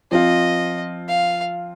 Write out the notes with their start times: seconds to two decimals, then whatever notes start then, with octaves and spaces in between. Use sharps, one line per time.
0.12 F3 C4 F4 D#5
1.08 F5